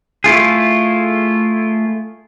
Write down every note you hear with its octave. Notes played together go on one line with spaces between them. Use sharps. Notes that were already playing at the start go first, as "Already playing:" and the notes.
A3 E4 F4 G#4